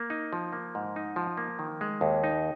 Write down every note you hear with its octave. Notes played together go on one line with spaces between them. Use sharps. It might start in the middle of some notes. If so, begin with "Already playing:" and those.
Already playing: A#3
D#4
F3
A#3
G#2
D#4
F3
A#3
D#3
G#3
D#2
D#4